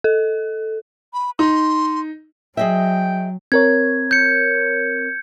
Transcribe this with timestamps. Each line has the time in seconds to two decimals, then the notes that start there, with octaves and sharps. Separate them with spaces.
0.04 A4
1.14 B5
1.39 D#4 C6
2.57 F#3 G#4 D#5 E5 G5
3.52 C4 A#4 C#5 G#6
4.11 G6 C#7